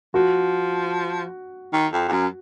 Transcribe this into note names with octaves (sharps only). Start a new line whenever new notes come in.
F3 F#4
D#3
F2
F2
F#2